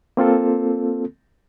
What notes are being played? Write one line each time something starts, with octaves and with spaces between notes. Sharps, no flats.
A#3 C4 F4 A4